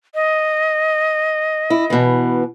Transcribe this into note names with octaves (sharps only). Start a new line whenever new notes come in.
D#5
E4
B2 E3